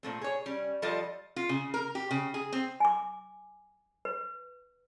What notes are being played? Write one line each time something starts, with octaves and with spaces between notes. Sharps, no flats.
A#2 A3 C4
G#4 C#5
G3 C#4
F3 G3 F4 A4 D5 D#5
F4
C#3
A#4
G4
C#3
G#4
C4
G#5 D6
B4